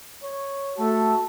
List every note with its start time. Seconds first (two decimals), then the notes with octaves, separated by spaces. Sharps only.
0.23 C#5
0.78 A3 F#4 A5